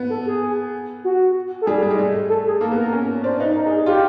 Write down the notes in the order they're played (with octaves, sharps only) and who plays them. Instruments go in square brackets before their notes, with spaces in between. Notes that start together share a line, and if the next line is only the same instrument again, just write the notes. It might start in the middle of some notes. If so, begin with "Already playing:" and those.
Already playing: [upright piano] B3
[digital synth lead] A4
G#4
F#4
A4
[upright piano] G3 [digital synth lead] G#4
[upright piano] G3
G#3
A3
[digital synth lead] A4
G#4
[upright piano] A#3 [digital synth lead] A4
[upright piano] B3
[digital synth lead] A#4
[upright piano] C#4
[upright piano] D4 [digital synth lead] C5
[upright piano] D#4 [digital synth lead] B4
[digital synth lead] A#4
G#4
G#4
[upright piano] F4 [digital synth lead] G4